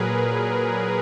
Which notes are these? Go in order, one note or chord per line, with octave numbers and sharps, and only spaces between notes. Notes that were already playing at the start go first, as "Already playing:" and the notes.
Already playing: A#2 F#3 G#4 A#4 B4